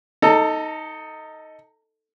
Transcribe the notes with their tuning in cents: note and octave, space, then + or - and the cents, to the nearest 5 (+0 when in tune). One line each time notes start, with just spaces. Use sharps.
D#4 +10 A4 +10 A#5 -25